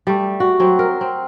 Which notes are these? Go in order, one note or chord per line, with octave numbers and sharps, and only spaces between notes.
G3 A3
F#4
F#3 C4
A#4
C4